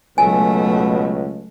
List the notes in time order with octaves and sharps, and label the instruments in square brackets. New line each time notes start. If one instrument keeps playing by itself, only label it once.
[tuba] C#2 [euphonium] B2 [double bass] F#3 A3 [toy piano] G#5